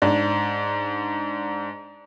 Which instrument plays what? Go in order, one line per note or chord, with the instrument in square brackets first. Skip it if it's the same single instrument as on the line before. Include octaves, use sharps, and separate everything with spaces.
[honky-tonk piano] G#2 D4